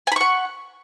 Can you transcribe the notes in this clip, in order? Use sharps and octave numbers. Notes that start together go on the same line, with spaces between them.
F#5 G#5 B5 C#6